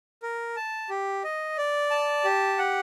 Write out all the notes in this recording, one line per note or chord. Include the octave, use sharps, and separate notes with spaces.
A#4
A5
G4
D#5
D5
A5
G4
F#5